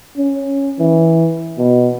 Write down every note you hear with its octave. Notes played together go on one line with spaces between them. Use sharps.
C#4
E3
B2